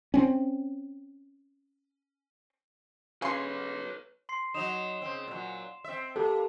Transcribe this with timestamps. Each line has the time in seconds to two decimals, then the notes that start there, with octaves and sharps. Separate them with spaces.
0.14 C4 C#4
3.22 C#3 B4 C#5 C6
4.29 C6 C7
4.54 F#3 D#4 E7 F7
5.02 C#3 C4
5.28 A#2 F#3
5.84 C4 E5
6.16 A#3 G4 A4